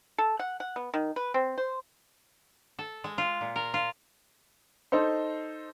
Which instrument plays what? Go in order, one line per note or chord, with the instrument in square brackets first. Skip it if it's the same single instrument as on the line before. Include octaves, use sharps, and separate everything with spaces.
[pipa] A4
F#5
F#5
B3
D#3
B4
C4
C5
[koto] A4
G#3
F4
A#2
A#4
F4
[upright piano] D#4 A4 C5 C6